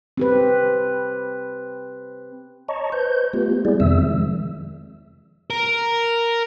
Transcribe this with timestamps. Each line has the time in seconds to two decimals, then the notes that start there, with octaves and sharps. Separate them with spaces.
0.18 C4 G4 B4
2.68 C#5 D#5 A5 A#5 C#6
2.92 B4 C5 G6
3.33 A3 B3 F4 G4
3.65 G3 G#3 B3 E4 G#4 D5
3.80 F2 C3 D#3 C4 E5 E6
3.99 D#3 F3 G#3
5.50 A#4